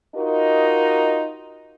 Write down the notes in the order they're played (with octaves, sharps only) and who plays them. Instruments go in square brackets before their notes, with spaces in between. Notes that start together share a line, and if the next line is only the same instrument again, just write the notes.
[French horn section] D#4 F4 F#4 A#4 D#5